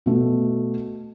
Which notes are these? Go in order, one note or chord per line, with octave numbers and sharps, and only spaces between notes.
B2 A3